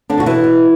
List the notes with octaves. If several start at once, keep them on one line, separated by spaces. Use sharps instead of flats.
D3 D4
B2 F#4
E3 E4
B2